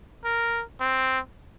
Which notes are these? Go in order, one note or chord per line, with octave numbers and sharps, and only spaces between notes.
A#4
C4